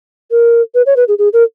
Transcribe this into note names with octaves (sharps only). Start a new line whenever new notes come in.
A#4
B4
C#5
B4
G#4
G#4
A#4